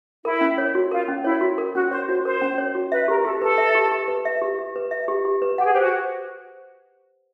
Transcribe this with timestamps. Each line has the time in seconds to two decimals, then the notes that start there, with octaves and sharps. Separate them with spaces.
0.24 E4 A#4
0.41 C#4
0.58 C#5
0.75 F#4
0.91 F4 A#4
1.08 C#4
1.24 E4 C#5
1.41 F#4
1.58 A#4
1.74 C#4 F#4
1.91 C5 C#5
2.08 F#4 C5
2.25 A#4 C5
2.41 C#4
2.58 C#5
2.75 F#4
2.92 B4 E5
3.08 G4 A#4
3.24 G4 A4
3.42 A4 B4
3.58 E5
3.75 G4
3.92 G4
4.08 B4
4.25 E5
4.41 G4
4.59 G4
4.76 B4
4.91 E5
5.08 G4
5.25 G4
5.42 B4
5.58 G4 F#5
5.65 G#4
5.73 G4 C5
5.80 F#4